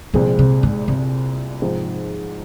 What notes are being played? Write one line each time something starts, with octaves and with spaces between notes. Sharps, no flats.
C2 A#2 F3 G#3 C4 G#4
C3
G#2
C3
G#2 F3 C4 D#4